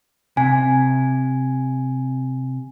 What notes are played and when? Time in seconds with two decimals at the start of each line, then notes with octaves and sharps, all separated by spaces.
0.37 C3 G#5